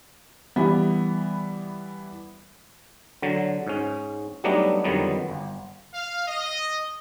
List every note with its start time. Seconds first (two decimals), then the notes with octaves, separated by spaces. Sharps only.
0.56 E3 G3 B3
3.22 D3 F#3
3.67 G#2 C#4
4.44 F#3 G3 A3 B3 D4 D#4
4.84 F2 D3 D#3 F#3 G3 B3
5.30 G1
5.94 F5
6.28 D#5